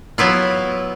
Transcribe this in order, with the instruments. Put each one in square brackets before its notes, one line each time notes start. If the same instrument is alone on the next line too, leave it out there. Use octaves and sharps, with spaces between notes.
[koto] F#3 B3 E4 F4